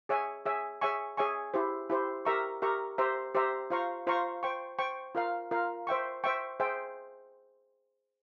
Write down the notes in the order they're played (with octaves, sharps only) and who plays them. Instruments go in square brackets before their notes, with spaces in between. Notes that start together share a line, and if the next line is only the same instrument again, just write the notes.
[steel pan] G#4 C#5 E5 G#5
G#4 C#5 E5 G#5
G#4 C#5 E5 G#5 C#6
G#4 C#5 E5 G#5 C#6
E4 G4 C5
E4 G4 C5
G4 A#4 E5 A#5 C#6
G4 A#4 E5 A#5 C#6
G4 C5 E5 A#5
G4 C5 E5 A#5
F4 C5 F5 A#5 C#6
F4 C5 F5 A#5 C#6
C5 G5 C#6
C5 G5 C#6
F4 A#4 F5
F4 A#4 F5
C5 E5 G5 C#6
C5 E5 G5 C#6
G#4 C5 E5 G5